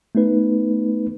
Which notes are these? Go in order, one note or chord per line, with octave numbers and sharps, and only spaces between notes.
A3 B3 D#4 B4